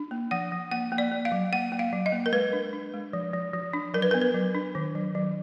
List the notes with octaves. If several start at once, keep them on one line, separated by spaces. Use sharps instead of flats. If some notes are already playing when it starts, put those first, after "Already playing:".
Already playing: D4
A#3
F3 F#5
F3
A#3 F#5
A#3
D5
A#3
F5
F#3
A#3 F#5
A#3
F5
F#3
D#5
A#3
A#4
G#3 B4
D4
D4
G#3
F3
F3
F3
D4
F#3 A#4
B4
A#4
B3
B4
F#3
D4
D#3
F#3
F#3